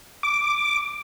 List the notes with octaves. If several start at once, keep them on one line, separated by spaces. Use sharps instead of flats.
D6